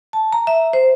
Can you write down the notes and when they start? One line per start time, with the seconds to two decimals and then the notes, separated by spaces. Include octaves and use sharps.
0.13 A5
0.33 A#5
0.47 E5
0.73 C5